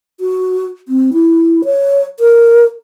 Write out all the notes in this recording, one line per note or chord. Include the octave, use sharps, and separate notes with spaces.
F#4
C4
E4
C#5
A#4